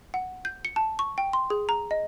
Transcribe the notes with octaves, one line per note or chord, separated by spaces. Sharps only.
F#5
G6
C#7
A5
C#6
G5
C6
G#4
A#5
D#5